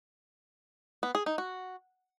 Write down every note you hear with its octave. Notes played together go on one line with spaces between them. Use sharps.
B3
G#4
D#4
F#4